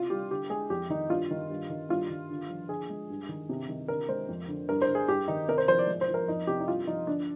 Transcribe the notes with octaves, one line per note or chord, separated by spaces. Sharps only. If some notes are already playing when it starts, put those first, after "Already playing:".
Already playing: C3 F4
G3 G4
D3 G4
G#3 G#4
F2 G4
D#3 D#4
G2 F4
D#3
G2
D#3
G2 F4
D#3
D3
F3
D3 G#4
G#3
G2
D#3
C3
D#3
D3 A#4
G#3 C5
F2
D3
G2 A#4
C5
D3
G#4
G2 G4
D#3 D#4
C3 A#4
C5
F3 C5
D5
G#2
C5
F3
A#4
F2 D#4
C3 G4
D#4
G2 F4
F3 D#4
D3 D4